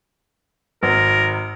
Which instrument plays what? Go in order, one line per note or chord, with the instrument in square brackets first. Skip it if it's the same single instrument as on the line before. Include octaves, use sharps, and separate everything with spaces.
[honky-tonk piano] G#1 [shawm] A#4